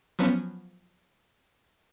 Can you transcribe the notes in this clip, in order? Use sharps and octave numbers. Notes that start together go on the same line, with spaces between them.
F3 F#3 B3 C#4